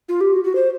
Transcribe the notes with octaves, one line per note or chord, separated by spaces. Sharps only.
F4
G4
F#4
F#4
C5